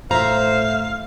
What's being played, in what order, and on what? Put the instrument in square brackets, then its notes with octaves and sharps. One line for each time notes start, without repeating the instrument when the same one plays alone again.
[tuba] A2 [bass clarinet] C5 [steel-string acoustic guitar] E5 A#5 [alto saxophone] F5